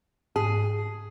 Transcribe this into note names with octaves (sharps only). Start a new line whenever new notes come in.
G#2 G#4